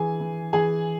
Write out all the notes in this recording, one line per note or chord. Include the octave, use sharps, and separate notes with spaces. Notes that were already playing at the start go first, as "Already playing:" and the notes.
Already playing: E3 G#4 G#5
E3
E3 G#4 G#5